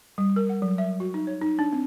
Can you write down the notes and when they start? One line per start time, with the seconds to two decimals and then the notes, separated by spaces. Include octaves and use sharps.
0.18 G3
0.36 A#4
0.49 F#5
0.62 F#3
0.78 E5
1.00 F#4
1.14 D#4
1.27 C#5
1.42 D#4
1.59 D4
1.73 C4